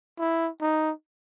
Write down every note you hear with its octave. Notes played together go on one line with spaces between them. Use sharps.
E4
D#4